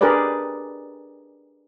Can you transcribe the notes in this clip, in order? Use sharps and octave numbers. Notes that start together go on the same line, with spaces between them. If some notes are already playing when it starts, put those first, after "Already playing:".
D4 G4 G#4 A#4 B4 D5